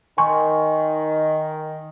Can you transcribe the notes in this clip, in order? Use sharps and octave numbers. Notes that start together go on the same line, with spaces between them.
D#3 G#5 C6 C#6